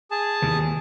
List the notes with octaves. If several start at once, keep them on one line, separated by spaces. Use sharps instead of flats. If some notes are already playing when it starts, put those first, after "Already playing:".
G#4 A5
D#2 C3 E3